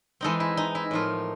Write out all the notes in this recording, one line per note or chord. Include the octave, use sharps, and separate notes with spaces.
E3 G#3 C4 D#4 A4
E4
D#4
E4
A2 F3 A#3 D#4 F4